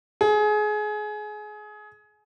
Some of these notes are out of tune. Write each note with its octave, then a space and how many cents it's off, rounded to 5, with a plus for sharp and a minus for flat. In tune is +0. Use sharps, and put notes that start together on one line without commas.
G#4 +25